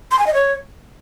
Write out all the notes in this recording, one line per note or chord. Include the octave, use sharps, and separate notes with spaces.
C6
G#5
D#5
C#5